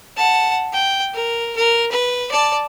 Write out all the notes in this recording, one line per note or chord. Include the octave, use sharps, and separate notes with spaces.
F#5 A5
G5
A#4
A#4
B4
D5 A5